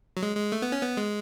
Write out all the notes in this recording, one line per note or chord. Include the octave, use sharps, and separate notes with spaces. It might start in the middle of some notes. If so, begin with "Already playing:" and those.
F#3
G#3
G#3
A3
B3
C#4
B3
G#3